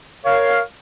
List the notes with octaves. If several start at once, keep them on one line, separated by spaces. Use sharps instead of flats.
A#4 C#5 F5